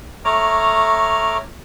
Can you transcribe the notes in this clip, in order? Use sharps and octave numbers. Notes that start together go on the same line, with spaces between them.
A3 C#5 A#5 D6 F6